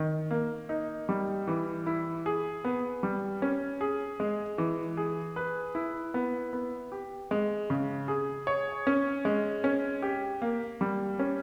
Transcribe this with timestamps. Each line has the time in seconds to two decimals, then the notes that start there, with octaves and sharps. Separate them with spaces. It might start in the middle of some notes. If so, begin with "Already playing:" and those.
Already playing: D#3
0.31 A#3
0.69 D#4
1.09 G3
1.47 E3
1.86 E4
2.26 G#4
2.65 B3
3.03 G3
3.42 C#4
3.81 G#4
4.20 G#3
4.58 E3
4.97 G#4
5.36 B4
5.75 E4
6.14 B3
6.53 B3
6.92 G4
7.31 G#3
7.70 C#3
8.08 G#4
8.47 C#5
8.87 C#4
9.25 G#3
9.64 C#4
10.02 G4
10.42 A#3
10.81 G3
11.19 C#4